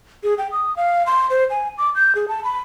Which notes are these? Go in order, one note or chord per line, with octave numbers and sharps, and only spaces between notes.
G#4
G5
D#6
F5
C6
C5
G#5
D6
G6
G#4
A5
B5